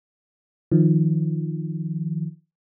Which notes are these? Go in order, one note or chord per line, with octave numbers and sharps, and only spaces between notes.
D#3 F3